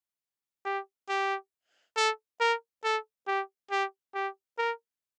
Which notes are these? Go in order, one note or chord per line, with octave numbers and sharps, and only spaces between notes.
G4
G4
A4
A#4
A4
G4
G4
G4
A#4